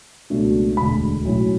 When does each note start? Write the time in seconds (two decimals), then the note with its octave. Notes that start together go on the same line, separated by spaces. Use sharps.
0.30 C#2 B2 F#3 A3 D4
0.77 E1 D2 D3 G#3 B5
1.24 B1 A2 F#3 C#4 E4